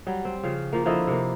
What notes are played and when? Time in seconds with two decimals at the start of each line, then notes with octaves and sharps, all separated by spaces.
0.07 F#3 G3
0.25 C4
0.43 C#3 F3 F5
0.73 F3 A#3
0.85 D3 F3 E4 D#5
1.07 C3 A#3